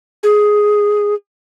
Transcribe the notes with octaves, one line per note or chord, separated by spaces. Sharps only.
G#4